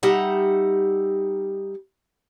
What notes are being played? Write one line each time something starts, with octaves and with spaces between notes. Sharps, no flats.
G3 D#4 E5 F#5